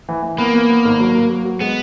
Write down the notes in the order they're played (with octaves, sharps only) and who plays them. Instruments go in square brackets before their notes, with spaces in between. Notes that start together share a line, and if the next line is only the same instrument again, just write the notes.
[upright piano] E3
E3
[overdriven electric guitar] A#3 [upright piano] B3
[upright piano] B3
B3
G#1
F#3
F#3
F#3
F#3
[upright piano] G#3 [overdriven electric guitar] B3